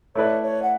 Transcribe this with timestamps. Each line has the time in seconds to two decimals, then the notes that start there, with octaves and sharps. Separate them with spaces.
0.15 A3 E4 B4 C#5 D5
0.43 C#5
0.63 F#5